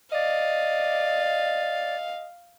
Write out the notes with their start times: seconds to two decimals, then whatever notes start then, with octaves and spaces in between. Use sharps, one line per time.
0.12 D5 D#5 F5